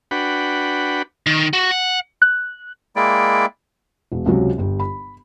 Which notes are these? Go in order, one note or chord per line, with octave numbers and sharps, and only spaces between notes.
D4 F#4 B4 F#5 G5 B5
D#3
F#4
F#5
F#6
G#3 A#3 E4 D5 G5
E1
C#2 C3 F#3
G1 G4
B5